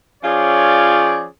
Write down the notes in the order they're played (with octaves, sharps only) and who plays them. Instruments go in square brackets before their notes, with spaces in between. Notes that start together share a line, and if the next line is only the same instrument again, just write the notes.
[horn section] F3 C#4 F4 G#4 C#5 D5